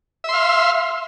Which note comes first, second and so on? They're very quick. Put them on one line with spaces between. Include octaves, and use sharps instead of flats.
E5 C6 F5